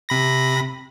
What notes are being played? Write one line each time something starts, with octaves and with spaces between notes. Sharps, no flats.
C3 B5 A#6